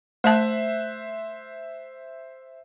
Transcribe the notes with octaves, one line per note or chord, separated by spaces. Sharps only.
A3 C5 E5 A5 F#6